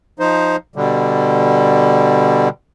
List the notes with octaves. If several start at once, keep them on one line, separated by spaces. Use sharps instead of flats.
F3 D#4 C5
B2 D3 G3